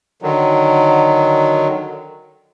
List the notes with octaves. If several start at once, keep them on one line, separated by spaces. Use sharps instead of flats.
D3 D#3 F#3